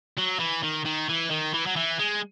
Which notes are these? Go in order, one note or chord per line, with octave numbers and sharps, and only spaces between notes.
F#3
E3
D#3
D#3
E3
D#3
E3
F#3
E3
G#3